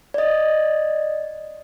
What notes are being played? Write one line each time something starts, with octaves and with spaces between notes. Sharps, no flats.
D5 D#5